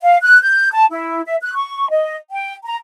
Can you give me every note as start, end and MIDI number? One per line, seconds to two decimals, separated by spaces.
0.03 0.17 77
0.23 0.41 90
0.42 0.70 91
0.73 0.86 81
0.91 1.22 64
1.26 1.36 76
1.42 1.51 90
1.55 1.88 85
1.90 2.16 75
2.31 2.54 79
2.66 2.76 82